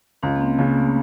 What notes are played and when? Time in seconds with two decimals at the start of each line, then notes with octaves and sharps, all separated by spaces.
0.23 C#2 C#4
0.36 A#3
0.41 C4
0.58 C#3 A#3
0.76 A3